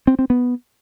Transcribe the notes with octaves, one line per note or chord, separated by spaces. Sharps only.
C4
C4
B3